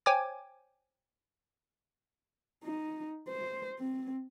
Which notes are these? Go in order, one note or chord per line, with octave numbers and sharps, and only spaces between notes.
C5 C#5 G5 G#5 D6 G#6
D#4
C5
C4